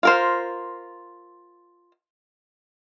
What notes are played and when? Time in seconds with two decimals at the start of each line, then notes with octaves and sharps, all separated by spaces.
0.03 F4 A#4 C5